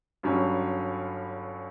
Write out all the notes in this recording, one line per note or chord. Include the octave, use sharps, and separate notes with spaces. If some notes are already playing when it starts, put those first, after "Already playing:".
G1 G2 F#3 C#4